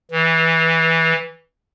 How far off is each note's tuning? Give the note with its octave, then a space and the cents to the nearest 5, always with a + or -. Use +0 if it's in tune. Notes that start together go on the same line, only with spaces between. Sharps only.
E3 -15